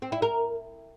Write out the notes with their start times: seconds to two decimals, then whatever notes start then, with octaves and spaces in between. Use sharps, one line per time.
0.02 C4
0.12 E4
0.22 A#4